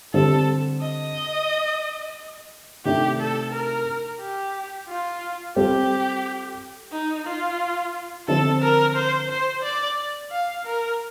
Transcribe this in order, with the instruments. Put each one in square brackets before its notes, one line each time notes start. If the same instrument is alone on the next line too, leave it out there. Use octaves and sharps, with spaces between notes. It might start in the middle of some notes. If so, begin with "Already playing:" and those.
[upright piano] D3 G3 C4 [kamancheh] A4
[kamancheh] D#5
[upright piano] C3 D#3 A3 D4 [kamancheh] G4
[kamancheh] A4
A#4
G4
F4
[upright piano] G3 C4 F4 A4 [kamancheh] G4
[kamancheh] D#4
F4
[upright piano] D3 F3 C4 [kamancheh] A4
[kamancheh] A#4
C5
C5
D5
F5
A#4